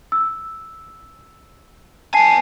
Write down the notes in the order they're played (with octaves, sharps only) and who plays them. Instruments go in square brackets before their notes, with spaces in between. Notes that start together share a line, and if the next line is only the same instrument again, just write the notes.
[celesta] E6
[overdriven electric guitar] B3 G#5 [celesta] A5 C7